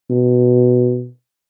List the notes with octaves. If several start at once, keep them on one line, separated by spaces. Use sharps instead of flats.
B2